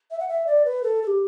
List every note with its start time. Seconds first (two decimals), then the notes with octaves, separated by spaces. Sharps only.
0.11 E5
0.20 F#5
0.29 E5
0.47 D5
0.65 B4
0.83 A4
1.03 A4
1.07 G4